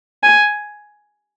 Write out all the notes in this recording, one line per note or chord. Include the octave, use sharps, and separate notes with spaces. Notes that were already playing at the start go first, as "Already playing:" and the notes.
G#5